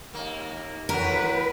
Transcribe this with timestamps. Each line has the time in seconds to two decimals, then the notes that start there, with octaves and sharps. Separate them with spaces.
0.14 D#2 A#3
0.89 E2 A2 F#4 A#4 B4